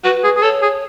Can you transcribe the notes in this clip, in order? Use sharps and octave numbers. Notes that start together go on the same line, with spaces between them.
F#4 B4
G#4
G#4
A4 C#5
G#4